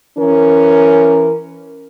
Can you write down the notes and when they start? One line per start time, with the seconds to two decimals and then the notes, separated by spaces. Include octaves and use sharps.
0.19 E3 C#4 A#4